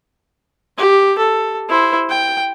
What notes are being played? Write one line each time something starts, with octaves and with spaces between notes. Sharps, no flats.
G4
A4
E4 C5
G5